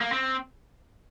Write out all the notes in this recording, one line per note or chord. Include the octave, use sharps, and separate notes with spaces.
A#3
C4